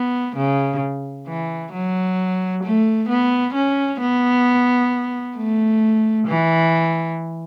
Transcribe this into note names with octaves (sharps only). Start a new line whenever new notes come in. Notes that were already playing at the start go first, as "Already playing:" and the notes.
Already playing: B3
C#3
E3
F#3
A3
B3
C#4
B3
A3
E3